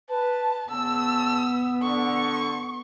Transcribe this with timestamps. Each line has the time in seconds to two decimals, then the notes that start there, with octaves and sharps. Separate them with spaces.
0.10 B4 A5
0.71 C#3 B3 A5 E6
1.83 D3 C#6